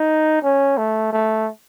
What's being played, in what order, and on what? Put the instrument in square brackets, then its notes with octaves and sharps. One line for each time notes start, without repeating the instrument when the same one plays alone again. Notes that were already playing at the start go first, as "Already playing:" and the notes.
Already playing: [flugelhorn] D#4
C#4
A3
A3